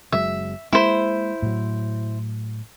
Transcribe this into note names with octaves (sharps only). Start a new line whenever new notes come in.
F#1 F#3 G#3 E5
G#3 A#3 E4 C5
A2 F#3